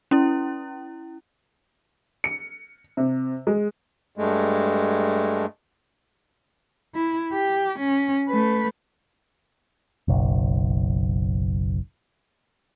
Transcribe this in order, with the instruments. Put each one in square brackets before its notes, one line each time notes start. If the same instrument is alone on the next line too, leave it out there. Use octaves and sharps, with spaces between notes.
[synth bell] C#4 E4
[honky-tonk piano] C#7
C3
G#3
[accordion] G2 G#3 A3
[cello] E4
G4
C#4
A3 B4
[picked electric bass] F#1 B1